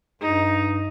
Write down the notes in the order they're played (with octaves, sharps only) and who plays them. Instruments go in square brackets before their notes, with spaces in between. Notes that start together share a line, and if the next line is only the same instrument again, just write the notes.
[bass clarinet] G2 [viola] D#4